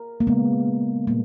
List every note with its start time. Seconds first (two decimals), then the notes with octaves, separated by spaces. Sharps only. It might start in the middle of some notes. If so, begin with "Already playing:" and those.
Already playing: A#4
0.20 A#3
0.27 C#3 G#3 B3
1.07 A#2 G3 A#3